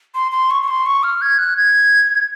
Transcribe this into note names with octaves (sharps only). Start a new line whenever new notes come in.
C6
C6
C#6
C#6
C6
C#6
F6
G#6
F#6
G#6